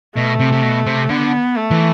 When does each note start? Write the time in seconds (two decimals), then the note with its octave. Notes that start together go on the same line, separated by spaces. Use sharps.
0.16 B2 A3
0.39 C3
0.52 C3
0.62 B2
0.86 C3
1.10 D3 B3
1.56 A3
1.71 E3